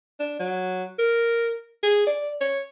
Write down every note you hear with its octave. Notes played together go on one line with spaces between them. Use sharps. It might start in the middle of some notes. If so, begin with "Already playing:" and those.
D4
F#3
A#4
G#4
D5
C#5